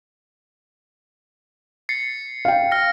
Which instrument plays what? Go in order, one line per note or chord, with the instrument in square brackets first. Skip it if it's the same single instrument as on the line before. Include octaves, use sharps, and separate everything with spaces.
[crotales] A6 C7 C#7
[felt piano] F5 G5
[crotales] F6 A#6